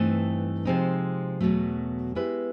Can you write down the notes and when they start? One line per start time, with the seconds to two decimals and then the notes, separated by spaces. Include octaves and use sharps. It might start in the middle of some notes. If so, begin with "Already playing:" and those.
Already playing: G2 E3 A3 C4 D#4
0.65 C3 F3 G#3 C4 D#4
1.41 E2 B2 F#3 A3
2.15 G#3 B3 E4 G4 B4